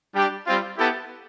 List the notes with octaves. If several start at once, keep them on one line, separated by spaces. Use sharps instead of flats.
G3 D4 G4
G3 C4 F4
B3 E4 G4 A4 A5